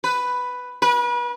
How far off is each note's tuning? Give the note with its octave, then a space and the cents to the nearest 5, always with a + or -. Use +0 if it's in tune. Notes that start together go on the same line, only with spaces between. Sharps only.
B4 +5
B4 -35